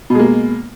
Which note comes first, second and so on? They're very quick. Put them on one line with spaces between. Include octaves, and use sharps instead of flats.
B2 G#3 A#3